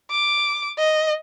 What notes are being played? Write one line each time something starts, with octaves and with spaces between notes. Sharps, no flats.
D6
D#5